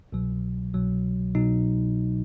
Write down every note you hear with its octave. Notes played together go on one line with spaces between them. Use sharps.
C2 B2 F#3
C2 B2 F#3
B2 F#3 D#4